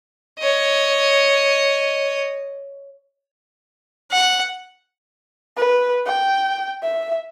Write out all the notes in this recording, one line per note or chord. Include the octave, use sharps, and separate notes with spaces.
C#5 D#5
F#5
B4
G5
E5